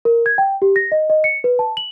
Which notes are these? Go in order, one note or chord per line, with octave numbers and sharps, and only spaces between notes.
A#4
G#6
G5
G4
A#6
D#5
D#5
C#7
B4
A5
F#7